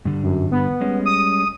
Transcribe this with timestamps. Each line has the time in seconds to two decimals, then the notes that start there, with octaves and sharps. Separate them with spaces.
0.05 G2 D3 G3
0.23 F#2
0.52 B3
0.81 G3 G#3 C#4
1.06 D#6